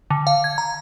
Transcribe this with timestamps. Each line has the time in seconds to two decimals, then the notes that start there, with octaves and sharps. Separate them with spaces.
0.10 D3
0.27 F5
0.44 G#6
0.58 A#5